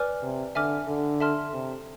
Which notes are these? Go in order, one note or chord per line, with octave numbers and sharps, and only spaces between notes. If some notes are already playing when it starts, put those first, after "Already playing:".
Already playing: B4 D5 G#5 D6 F6
C3
D3 E5 G#5 D6 F6
D3
A4 E5 A5 C6 F6
C3